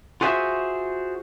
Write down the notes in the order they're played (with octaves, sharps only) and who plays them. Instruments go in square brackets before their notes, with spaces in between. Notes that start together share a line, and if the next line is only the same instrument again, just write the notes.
[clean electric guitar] F4 F#4 G#4 C5 E5